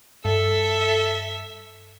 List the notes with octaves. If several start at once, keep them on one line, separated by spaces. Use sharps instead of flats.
G2 A4 E5